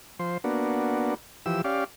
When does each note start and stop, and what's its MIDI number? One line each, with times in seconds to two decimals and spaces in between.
0.19 0.38 53
0.19 0.38 72
0.44 1.14 58
0.44 1.14 59
0.44 1.14 62
0.44 1.14 66
1.46 1.62 52
1.46 1.62 53
1.46 1.62 67
1.46 1.62 88
1.64 1.84 61
1.64 1.84 67
1.64 1.84 74
1.64 1.84 77